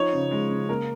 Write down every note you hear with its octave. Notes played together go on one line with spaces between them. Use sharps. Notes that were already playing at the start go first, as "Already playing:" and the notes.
Already playing: F3 D#4 C#5
C#3
G#3
C#3
A#3 A#4